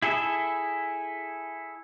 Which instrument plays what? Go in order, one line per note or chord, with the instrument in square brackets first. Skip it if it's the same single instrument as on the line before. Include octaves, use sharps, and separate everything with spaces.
[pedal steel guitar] E4 G#4 A4 E5